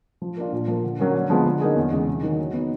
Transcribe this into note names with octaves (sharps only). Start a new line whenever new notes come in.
F3
A#3 D4 F4
A#2
F3 A#3
D3
F#3 A#3 C#4
D3
F3 G#3 B3
D3
F#3 A#3 D#4 G#4
E2
C#3 E3 G#3
C3
D#3 F#3 A#3 D#4
F#3
B3 D#4